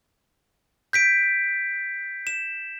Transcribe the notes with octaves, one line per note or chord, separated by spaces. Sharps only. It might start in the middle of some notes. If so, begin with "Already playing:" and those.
G6 B6 D7
E7